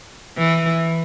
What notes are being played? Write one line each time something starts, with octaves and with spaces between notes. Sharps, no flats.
E3